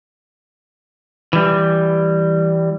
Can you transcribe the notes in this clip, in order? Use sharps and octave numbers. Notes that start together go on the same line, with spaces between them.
E3 G3